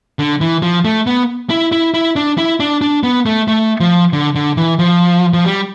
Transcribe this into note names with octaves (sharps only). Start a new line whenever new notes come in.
D3
E3
F3
A3
B3
E4
E4
E4
D4
E4
D4
D4
B3
A3
A3
F3
D3
D3
E3
F3
F3
G3